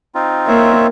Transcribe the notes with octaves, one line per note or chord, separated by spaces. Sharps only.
C4 D#4 F4
A#3 C#5 E5